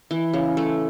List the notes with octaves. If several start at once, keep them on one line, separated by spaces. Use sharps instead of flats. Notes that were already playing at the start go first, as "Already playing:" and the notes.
E3
C#3
A3